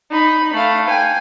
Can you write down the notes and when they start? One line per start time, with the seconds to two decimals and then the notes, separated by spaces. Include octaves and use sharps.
0.11 D#4 B5
0.53 A3 F5
0.88 G5 G#5